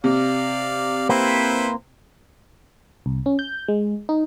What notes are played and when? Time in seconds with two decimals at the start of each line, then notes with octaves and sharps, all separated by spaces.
0.04 C3 D5 F5
1.09 A#3 C4 E4 B4 C5
3.06 C2
3.26 C#4
3.39 G6
3.68 G#3
4.09 D#4